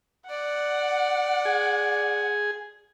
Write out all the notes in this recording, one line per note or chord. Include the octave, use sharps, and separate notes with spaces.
D5 F#5
G#4